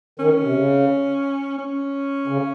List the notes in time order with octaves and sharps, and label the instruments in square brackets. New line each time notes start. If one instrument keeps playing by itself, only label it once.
[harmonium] D#3 [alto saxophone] C#4
[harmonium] C3
C#3
[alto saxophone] C#4
[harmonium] C#3